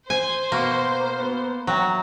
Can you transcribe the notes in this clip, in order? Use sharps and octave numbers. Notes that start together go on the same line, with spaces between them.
C5 G#5
B2 A#3 B3 C#6
B3
F#3 E5 G5 A#5